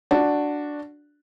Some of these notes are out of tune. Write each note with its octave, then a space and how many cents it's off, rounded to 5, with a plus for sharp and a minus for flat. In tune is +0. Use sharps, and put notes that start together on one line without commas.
D4 +0 F#4 +0